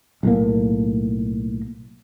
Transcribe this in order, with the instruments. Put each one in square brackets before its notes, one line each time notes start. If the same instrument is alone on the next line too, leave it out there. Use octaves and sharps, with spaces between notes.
[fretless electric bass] B1 A2 A#3